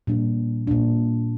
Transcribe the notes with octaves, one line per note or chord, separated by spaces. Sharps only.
A#2 G3 D4
A#2 G3 D4